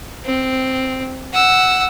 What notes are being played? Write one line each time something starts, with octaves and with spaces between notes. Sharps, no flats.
C4
F#5 E6